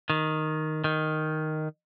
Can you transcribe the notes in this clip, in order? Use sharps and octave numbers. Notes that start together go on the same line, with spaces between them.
D#3
D#3